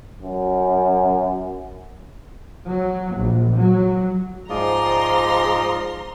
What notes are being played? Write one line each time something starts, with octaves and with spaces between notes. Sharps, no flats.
F#2
F#3
A#1
F#3
G#2 F3 D5 A#5 C6 D#6 A#6